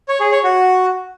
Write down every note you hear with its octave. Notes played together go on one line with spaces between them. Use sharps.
C#5
G#4
C#5
F#4